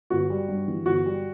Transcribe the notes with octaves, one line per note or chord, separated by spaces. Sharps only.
G1 F#4
G3
G2
E3
G1 F#4
G3